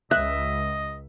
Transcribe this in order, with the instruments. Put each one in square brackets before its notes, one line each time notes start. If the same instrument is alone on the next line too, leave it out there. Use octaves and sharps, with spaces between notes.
[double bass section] C#2 [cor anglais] D#5 [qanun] E5 [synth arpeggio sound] F#6